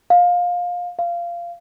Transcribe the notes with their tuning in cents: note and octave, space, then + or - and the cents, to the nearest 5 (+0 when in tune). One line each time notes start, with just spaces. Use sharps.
F5 +20
F5 -15